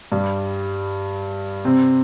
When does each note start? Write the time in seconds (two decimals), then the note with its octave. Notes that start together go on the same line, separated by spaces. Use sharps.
0.12 G2 G3
1.65 C3 C4